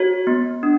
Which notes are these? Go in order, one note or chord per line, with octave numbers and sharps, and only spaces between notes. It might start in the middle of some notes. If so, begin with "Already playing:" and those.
Already playing: F#4 C#5
B3
D4